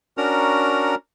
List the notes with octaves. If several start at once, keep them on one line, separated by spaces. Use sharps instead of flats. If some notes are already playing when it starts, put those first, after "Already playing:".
C#4 D4 F#4 A#4 A#5